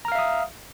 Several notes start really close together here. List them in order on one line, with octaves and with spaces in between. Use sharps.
A#5 F6 F5 E5 D#6